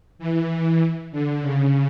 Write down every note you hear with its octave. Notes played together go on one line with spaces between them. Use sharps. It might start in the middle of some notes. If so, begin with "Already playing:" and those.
E3
D3
C#3